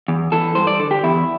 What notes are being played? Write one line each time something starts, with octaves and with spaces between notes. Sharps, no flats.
E2
E3 A4
G2 C5
D5
D3 A4
G4
E2 E4